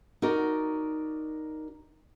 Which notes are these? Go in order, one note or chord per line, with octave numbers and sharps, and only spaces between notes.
D#4 F#4 A#4 D5